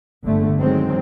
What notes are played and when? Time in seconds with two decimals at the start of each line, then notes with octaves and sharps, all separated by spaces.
0.24 G1 D3 A3
0.59 D#3 F#3 G#3 C4